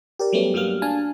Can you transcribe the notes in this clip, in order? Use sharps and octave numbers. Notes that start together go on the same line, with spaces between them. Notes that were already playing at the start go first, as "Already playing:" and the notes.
G4 A#4 D5
F#3 G3 A3 B3 C#4
G2 F#3 G3 A#3 F6
D4 F5 G#5 A5